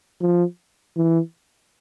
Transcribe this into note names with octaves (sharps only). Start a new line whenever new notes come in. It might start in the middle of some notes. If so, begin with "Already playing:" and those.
F3
E3